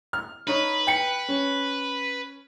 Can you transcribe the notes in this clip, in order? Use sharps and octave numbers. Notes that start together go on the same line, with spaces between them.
F6
D#4 B4 C#5
G5 C#7
C#4